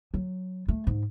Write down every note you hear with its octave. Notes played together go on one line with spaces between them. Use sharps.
F#3
A3
G#2